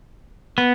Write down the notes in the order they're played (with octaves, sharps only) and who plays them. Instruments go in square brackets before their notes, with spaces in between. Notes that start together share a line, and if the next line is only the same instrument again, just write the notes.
[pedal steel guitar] B3